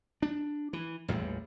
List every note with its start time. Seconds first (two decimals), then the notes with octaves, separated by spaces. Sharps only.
0.22 D4
0.73 E3
1.08 A1 E2 A#2 G3